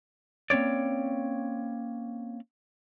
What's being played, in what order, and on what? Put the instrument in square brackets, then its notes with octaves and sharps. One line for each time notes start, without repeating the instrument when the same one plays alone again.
[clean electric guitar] A#3 C4 C#4 C#5 D5